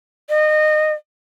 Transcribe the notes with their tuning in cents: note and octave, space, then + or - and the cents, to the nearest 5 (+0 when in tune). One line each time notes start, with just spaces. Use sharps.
D#5 -25